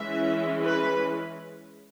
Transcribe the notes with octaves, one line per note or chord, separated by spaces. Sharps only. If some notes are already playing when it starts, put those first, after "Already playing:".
Already playing: E3 G#3 C#4 E5
B4